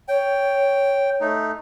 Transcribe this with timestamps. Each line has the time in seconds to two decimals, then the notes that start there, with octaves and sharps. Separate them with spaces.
0.08 C#5 G5
1.21 A3 D#4